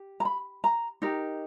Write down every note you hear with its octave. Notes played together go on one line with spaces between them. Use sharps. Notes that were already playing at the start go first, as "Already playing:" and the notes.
Already playing: G4
A#5
B5
A#5
D#4 G4 A#4